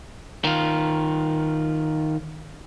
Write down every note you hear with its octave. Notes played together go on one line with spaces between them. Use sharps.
D#3 F4